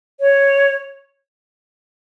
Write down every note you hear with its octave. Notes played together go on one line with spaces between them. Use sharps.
C#5